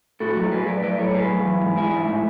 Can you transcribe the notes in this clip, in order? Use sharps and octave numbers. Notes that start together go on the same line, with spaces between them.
A2 F#4 A4
F#3 F#4 A4
F#3 G#4 B4
A2 B4 D5
F#3 B4 D5
A2 A4 C#5
A2 G#4 B4
F#3
E3
G#2
E3 E4 G#4
G#2
A2